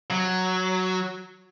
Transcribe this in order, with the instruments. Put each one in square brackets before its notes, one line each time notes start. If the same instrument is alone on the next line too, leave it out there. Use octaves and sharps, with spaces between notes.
[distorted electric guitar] F#3